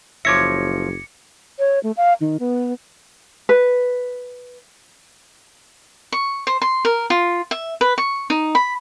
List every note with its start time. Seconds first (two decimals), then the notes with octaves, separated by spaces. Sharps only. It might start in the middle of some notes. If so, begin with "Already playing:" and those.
0.25 F#1 F3 C#5 E5 D6 G#6 A#6 C#7
1.59 C#5
1.83 A3
1.97 F5
2.21 D#3
2.39 B3
3.49 B4
6.12 C#6
6.47 C5
6.62 C6
6.85 A#4
7.10 F4
7.51 E5
7.81 B4
7.98 C#6
8.30 D#4
8.55 B5